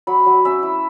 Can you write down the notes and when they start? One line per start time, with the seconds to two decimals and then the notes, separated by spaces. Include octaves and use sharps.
0.07 F#3 B5
0.26 F#3
0.45 C#4 E5
0.63 E4